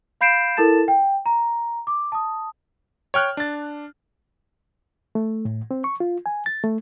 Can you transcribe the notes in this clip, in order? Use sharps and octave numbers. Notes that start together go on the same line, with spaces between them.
F5 B5 G6 C7 D7 E7
E4 A4 A#4 A5 A6 E7
G5
A#5
D6
A5 D#6
C#5 G5 F6 F#6
D4 A6
A3
A2
C4
C#6
F4
G#5
A6
A3